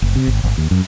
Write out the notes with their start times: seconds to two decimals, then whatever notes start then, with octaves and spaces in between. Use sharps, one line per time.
0.02 F#1
0.16 C3
0.27 G#1
0.44 G#1
0.58 D#2
0.71 F#2